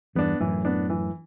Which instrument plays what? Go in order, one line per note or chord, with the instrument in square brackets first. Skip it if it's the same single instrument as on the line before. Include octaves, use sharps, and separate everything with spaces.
[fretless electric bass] E2 G2 [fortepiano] B3 D4
[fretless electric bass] F#2 A2 [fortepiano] E3
[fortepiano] B3 D4
E3